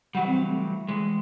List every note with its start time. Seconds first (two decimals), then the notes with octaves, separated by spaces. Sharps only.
0.15 E3 F#3 G3 F#5
0.27 C4
0.47 A3
0.88 E3 G#3